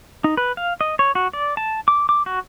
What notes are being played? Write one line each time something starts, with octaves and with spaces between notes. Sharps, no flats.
D#4
B4
F5
D#5
C#5
F#4
D5
A5
D6
D6
F#4